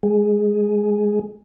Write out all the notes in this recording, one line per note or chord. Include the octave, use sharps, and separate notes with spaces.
G#3